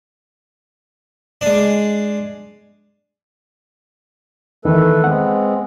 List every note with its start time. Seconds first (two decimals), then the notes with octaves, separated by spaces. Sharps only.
1.41 G#3 D4
4.65 E2 D#3 E3 A3 A4 B4
5.04 G#3 B3 C4 F#5